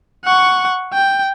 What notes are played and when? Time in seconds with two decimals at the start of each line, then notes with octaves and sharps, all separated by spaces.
0.25 F#5 C#6
0.93 G5